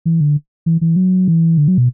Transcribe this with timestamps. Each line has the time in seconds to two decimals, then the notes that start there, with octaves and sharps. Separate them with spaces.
0.06 E3
0.21 D3
0.66 E3
0.81 E3
0.96 F#3
1.28 E3
1.58 D3
1.68 F#3
1.78 B2